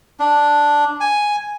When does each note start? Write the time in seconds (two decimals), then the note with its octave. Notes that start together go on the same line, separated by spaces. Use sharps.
0.20 D4
1.01 G#5